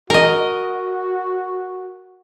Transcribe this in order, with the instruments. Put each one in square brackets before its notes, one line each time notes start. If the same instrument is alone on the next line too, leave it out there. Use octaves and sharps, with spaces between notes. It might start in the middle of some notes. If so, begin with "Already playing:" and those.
[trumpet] F#4 [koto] A#4 D#5